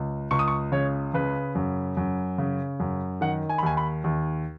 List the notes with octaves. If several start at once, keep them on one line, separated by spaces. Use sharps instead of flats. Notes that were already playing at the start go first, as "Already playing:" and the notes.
Already playing: C#2
C#2 C#6
D#6
C#6
C#3 C#5
C#3 B4
F#2
F#2
C#3
F#2
D#3 F#5
G#5
B5
D#2 G#5
B5
D#2